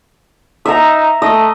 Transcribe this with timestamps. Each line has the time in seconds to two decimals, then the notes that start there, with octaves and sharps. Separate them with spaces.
0.66 D#4 E5 A#5
1.22 A3 D#5